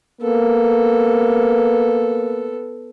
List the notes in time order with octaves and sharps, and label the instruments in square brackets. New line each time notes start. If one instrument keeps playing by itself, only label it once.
[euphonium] A#3 [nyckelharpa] B3 A4